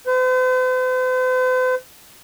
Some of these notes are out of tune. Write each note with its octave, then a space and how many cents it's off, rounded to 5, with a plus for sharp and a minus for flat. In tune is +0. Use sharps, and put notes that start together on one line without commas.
C5 -45